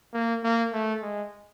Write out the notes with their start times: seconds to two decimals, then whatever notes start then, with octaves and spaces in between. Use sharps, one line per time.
0.14 A#3
0.43 A#3
0.73 A3
1.02 G#3